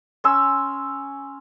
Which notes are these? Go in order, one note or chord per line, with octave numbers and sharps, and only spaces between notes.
C#4 C6 E6